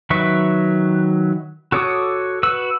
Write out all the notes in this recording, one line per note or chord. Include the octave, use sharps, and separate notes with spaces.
D#3 F#3 B4 E5 C#6
F#4 A4 C#5 D6 D#6
F#4 B4 E6